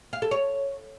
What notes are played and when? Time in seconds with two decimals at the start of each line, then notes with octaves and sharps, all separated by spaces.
0.13 F5
0.22 A4
0.31 C#5